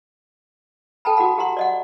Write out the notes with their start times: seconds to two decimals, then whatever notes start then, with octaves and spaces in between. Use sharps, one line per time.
1.05 A4 G5 A5 B5
1.17 F#4 G4 A4 F#5 B5
1.38 G4 F#5 A#5 C6
1.57 D5 D#5 F#5